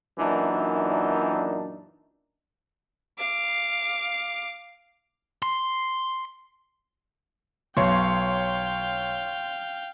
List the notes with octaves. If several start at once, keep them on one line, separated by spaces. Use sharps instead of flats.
F#2 A#2 E3 D4 D#4
F5 D6
C6
B1 C#5 F5 G5 C6 C#6